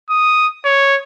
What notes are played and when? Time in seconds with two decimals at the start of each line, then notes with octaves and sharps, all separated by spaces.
0.10 D#6
0.65 C#5